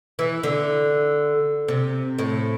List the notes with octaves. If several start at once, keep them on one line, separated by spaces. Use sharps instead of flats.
E3
D3
C3
A2